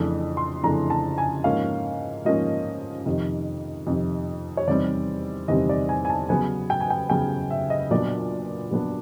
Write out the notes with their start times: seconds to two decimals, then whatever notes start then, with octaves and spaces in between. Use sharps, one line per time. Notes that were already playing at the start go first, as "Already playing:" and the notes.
Already playing: F2 C#3 E3 A3 D4
0.37 C6
0.63 F2 C#3 E3 A3 D4 A#5
0.90 A5
1.18 G#5
1.44 G#2 F3 A#3 C#4 F5
2.25 G#2 F3 A#3 C#4 D#5
3.06 F2 C3 D#3
3.87 F2 C3 D#3
4.57 C#5
4.68 E2 C3 D#3 G3 C4 D5
5.48 E2 C3 D#3 G3 C4 D#5
5.69 D5
5.89 G#5
6.05 G#5
6.10 A5
6.29 C#3 F#3 B3 G#5
6.70 G5
6.80 G#5
6.90 G5
7.10 C#3 F#3 B3 G5
7.50 E5
7.70 D#5
7.90 A#2 F#3 B3 D4 D5
8.71 A#2 F#3 B3 D4